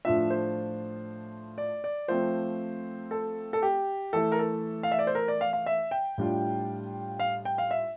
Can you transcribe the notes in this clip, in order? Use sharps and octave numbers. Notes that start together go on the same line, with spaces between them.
A2 F3 A3 D4 F4 E5
C5
D5
D5
F3 A3 C4 C5
A4
A4
G4
E3 A3 E4 A4
A#4
A4
F5
E5
D5
C5
A#4
D5
F5
F5
E5
G5
A2 G3 D4 F4
F5
G5
F5
E5